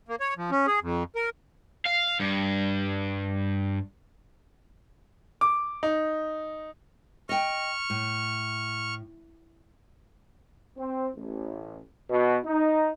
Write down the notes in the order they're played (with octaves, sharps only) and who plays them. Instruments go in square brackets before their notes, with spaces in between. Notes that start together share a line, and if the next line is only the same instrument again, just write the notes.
[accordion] A#3
C#5
F3
C#4
G#4
F2
A#4
[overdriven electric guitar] F5
G2
[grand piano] D6
D#4
[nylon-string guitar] D#5 G5 [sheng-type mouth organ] C#6 F6
[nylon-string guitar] A2
[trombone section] C4
A1
B2
D#4